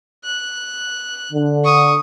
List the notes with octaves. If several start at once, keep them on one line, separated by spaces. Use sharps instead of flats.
F#6
D3
C#6 D#6